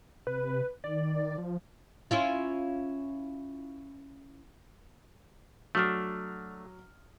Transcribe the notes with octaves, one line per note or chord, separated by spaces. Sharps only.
C3 B4
D#3 D5
F3
C#4 E4 F4
F#3 A3 D4 D#6 F6